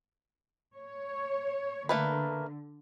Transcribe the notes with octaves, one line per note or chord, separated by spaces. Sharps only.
C#5
D3 A3 A#3 B4